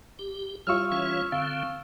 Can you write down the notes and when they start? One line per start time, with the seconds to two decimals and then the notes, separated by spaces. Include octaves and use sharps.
0.19 G4
0.67 G3 E4 F4 C#5 C#6 E6 F6
0.92 E3 C#4 C#5
1.32 D3 C4 F5